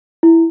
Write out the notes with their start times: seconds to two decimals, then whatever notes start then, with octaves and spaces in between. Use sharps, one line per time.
0.23 E4